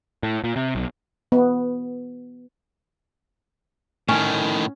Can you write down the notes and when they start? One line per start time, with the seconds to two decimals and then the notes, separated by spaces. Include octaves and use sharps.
0.23 A2
0.44 A#2
0.56 C3
0.75 B1
1.32 B3
4.09 A2 D#3 C#4